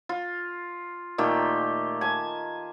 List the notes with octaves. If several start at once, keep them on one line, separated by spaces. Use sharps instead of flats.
F4
A#2 D#3 A3 G4
G#5 A5